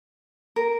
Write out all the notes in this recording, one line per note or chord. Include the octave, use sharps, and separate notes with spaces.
A#4